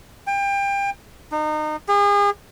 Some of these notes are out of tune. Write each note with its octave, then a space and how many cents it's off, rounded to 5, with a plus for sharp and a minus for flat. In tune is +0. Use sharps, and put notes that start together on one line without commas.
G5 +30
D#4 -30
G#4 -40